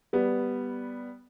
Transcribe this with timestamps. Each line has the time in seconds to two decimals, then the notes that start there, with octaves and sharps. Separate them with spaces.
0.13 G3 B3